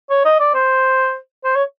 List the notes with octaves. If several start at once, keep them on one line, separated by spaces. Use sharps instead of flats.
C#5
D#5
D5
C5
C5
C#5